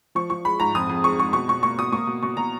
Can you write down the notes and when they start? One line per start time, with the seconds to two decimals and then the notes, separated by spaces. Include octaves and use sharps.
0.15 F3 C#6
0.30 F3 C#6
0.45 G#3 B5
0.59 G#2 A#5
0.75 F2 D#6
0.89 F2
1.04 G#3 C#6
1.19 G#3 C#6
1.33 B2 C#6
1.48 B2 C#6
1.63 A#3 C#6
1.78 B2 D#6
1.92 A#3 C#6
2.07 B2
2.23 B2 C#6
2.37 B2 A#5